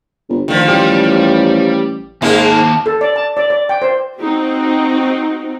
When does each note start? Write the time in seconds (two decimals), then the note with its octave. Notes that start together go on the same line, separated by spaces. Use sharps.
0.29 G1
0.48 D2 D#3 F3
0.68 A1 G3 G4
2.22 D#2 G#2 G#3 A#3 A5
2.86 A4
3.01 D5
3.16 A5
3.37 D5
3.50 D5
3.69 G5
3.82 C5
4.18 C4 D#4 F#4